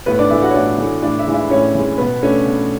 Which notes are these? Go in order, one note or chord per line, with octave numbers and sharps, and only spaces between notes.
A2 B3 B4
D4 D5
E3 A3 E4 E5
F#4 F#5
C#5
A2 D4 D5
E3 A3
A2 D4 D5
E4 E5
E3 G#3
E4 E5
A2 C#4 C#5
E3 G#3
B2 B3 B4
A3 C#4 D4 C#5
B2